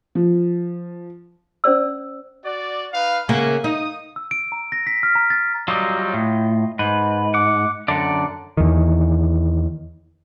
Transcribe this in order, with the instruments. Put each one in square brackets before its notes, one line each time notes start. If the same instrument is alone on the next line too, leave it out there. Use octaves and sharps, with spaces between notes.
[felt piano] F3
[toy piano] C#4 C5 D5 E6
[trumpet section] F#4 D5
D#4 B4 F5
[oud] C#3 A#3 [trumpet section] E5 F#5 G#5
[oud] D#4 [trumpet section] D#6
[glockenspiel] E6
D7
A#5
A#6
B6
F6
A#5
A6
[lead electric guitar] F#3 G3 [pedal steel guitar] F4 D#5
[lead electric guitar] A2
[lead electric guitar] G#2 [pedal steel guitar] B4
[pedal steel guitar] F#5 D6
[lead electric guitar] F#2 D3 [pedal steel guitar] D5 F#5
[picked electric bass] E2 D#3